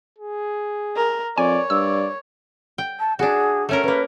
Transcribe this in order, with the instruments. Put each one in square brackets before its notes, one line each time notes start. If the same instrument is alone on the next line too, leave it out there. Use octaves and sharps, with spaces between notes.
[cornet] G#4
[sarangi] A#4
[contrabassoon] F2 [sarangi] C#5 [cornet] D5 [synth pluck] G#5
[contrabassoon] G2 [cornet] D5 [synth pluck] E6
[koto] G5
[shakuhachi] A5
[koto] D4 F#4 [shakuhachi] G#4
[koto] A3 C#4 A#4
[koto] A#3 C#4 [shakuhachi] B4